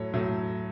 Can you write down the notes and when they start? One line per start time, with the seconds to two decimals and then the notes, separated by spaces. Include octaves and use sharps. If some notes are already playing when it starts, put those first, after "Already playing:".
Already playing: A2 F#3 A3 C#5
0.13 A2 F#3 A3